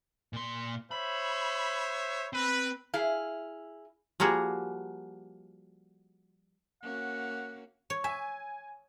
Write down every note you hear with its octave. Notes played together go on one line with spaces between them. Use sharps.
A#2 C6
C5 C#5 E5 B5
C4 B4
E4 G#4 F5
F3 G3 A#3 F#4 G#4
A#3 C#4 F#4 F#5
C#5
E5 G#5